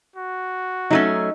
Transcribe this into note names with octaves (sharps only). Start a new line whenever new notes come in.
F#4
F#3 A3 C#4 D#4